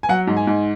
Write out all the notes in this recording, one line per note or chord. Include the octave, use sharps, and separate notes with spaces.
G#5
F#3 F#5
G#2
G#5
G#2